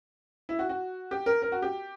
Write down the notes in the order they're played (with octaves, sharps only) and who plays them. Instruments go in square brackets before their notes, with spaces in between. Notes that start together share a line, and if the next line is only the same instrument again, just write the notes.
[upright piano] E4
F#4
F#4
G4
A#4
A#4
F#4
G4